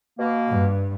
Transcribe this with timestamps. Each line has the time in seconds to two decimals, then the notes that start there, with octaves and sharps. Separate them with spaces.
0.19 B2 A#3
0.48 G2